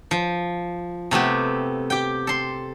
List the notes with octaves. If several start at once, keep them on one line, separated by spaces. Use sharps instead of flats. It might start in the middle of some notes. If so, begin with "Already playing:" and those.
F3
C3 A3 B3 G4
G4 G5
A4 C6